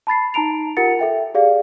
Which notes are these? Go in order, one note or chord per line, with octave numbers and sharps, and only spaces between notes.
A5 B5 A6 C7
D#4 A5 A#5 D7 F7
F4 G4 A#4 F#5 A6 C#7
A4 E5 G5
G4 G#4 D5 F5